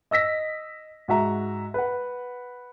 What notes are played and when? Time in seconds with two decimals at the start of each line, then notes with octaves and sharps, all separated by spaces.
0.11 D#5 E6 A#6 B6
1.08 G#2 F#4 E5 A#5
1.74 B4 F#5